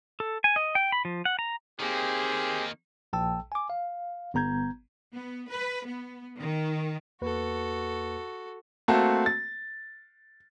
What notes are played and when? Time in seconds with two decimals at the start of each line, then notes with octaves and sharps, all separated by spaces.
0.20 A4
0.44 G#5
0.56 D#5
0.75 G5
0.92 B5
1.05 F3
1.25 F#5
1.39 A#5
1.80 D#3 A#3 C4 G4 G#4
3.13 A#1 G5 A5 E6
3.52 G#5 D6
3.70 F5
4.34 G1 B3 A#5 G6 G#6
5.13 B3
5.50 B4
5.86 B3
6.37 D#3
7.22 E2 A#3 F#4 A4 B4
8.88 A3 A#3 C4 F#4 A5
9.26 A6